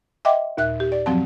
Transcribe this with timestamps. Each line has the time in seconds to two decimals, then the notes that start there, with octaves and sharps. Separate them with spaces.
0.25 D#5 E5 F#5 G5 C6 D6
0.57 D#2 A#2 E5 F#6
0.80 G4
0.92 D5
1.06 F#2 F3 F#3 C4 A5